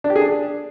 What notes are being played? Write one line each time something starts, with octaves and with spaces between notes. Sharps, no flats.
D4
G4
G#4
D4